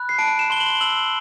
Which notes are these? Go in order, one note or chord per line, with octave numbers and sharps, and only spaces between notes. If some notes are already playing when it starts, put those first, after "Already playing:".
Already playing: B5 F#6
C7
A5 D7
E7
C6 G7
F#7
E6 F#7